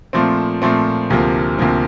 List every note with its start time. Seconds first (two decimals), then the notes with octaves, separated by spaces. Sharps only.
0.13 A#2 F3 A3 C4
0.62 A#2 F3 A3 C4
1.10 D2 C3 F3 A#3
1.59 D2 C3 F3 A#3